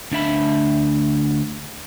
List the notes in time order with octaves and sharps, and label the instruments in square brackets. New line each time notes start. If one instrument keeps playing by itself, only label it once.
[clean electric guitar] D2 D4 E5 B5